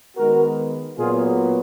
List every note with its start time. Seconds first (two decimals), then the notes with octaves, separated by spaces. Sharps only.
0.16 D#3 G#3 B3 F#4 A#4
0.97 A#2 F#3 B3 F4 G#4